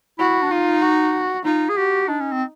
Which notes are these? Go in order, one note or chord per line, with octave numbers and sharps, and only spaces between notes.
E4 F#4
D4
D#4 F4
F#4
D#4 F4
G#4
F#4 G4
D4 D#4
C#4
C4